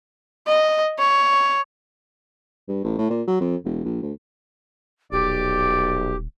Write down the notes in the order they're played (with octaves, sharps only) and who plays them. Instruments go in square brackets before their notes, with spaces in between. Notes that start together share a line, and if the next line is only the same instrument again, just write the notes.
[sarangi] D#5
C#5
[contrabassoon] G2
A1
A2
A#2
F#3
F2
E1
A#1
D2
[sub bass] D#1 [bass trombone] B1 [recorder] G4 [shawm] D5